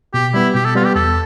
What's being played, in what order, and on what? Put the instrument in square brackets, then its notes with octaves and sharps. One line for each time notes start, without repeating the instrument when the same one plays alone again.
[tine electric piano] B2 [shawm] G4
[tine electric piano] G3 B3 [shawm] E4
[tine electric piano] B2 [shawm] G4
[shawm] A4
[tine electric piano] G3 B3 [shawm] F4
[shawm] G4
[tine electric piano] E2 [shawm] A4